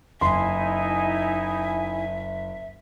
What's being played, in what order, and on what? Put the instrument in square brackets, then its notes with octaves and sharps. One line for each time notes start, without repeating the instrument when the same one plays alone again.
[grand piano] F#1 [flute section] D#4 E4 G#5 [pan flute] E5 [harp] C6